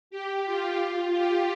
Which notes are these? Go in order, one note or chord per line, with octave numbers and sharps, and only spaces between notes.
G4
F4
G4